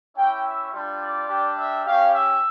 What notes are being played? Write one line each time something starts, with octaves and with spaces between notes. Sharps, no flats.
C#4 E4 G4 G5
E5
G3 D4 F4
D5
G3 D4 G4
E5
C#4 G4 F5
E5